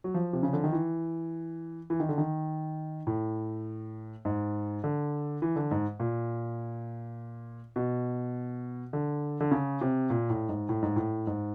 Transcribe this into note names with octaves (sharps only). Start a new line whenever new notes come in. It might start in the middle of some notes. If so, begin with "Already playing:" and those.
F#3
F3
C3
C#3
D3
D#3
E3
E3
D#3
D3
D#3
A2
G#2
D3
E3
D3
G#2
A#2
B2
D3
D3
C#3
C3
A#2
A2
G#2
A2
G#2
A2
G#2